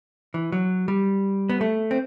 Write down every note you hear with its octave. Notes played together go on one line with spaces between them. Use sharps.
E3
F#3
G3
B3
A3
C4